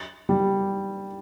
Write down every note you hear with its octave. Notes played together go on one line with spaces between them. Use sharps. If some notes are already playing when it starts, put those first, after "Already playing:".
G3